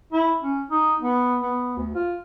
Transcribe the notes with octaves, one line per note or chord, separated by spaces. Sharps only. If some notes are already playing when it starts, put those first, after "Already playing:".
E4
C#4
D#4
B3
B3
D2
F4